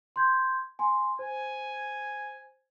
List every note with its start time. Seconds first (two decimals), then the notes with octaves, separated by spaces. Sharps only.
0.16 C6 G6 G#6
0.79 G#5 C6
1.19 C5 G#5